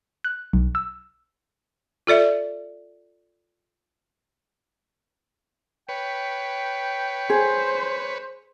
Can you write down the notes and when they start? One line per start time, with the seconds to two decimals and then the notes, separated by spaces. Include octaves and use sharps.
0.24 F#6
0.53 B1
0.75 E6
2.07 F4 A4 D5 E5
5.89 B4 C#5 G5
7.30 G#4 C5